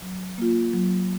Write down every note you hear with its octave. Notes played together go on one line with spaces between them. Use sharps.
F#3
A#3 F4
F#3